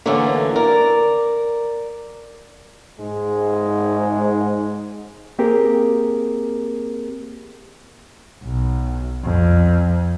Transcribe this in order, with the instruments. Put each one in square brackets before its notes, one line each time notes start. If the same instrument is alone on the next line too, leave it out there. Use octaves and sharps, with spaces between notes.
[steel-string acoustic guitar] D3 E3 F#3 A3 A#3 C#4
A#4 D5
[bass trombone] G#2 [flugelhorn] G#3
[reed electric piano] A#3 C4 G4 G#4 A#4
[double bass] B1
F2